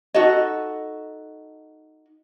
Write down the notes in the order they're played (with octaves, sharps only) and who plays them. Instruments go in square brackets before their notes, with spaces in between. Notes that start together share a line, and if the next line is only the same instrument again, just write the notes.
[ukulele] D#4 F#4 A4 D#5